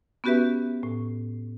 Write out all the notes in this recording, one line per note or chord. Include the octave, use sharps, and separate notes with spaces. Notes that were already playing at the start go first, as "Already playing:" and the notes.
B3 C#4 F#4 G4 B4 E5
A2